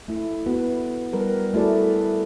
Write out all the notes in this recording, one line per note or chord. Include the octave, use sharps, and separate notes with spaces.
A3 E4
B3 F#4 B4
F#3 G3 A#4 B4
A3 E4 F#4 G#4 A4 D5